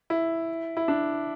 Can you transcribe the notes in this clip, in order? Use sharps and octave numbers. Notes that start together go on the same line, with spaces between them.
E4
E4
D4